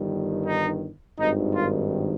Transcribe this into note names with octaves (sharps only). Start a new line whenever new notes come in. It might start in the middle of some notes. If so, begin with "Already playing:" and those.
Already playing: G1 G2 D#3
D#4
G#1 G2 D#3 D#4
F4